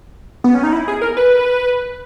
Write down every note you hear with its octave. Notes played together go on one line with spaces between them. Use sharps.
B3
C#4
D#4
E4
G#4
A#4
B4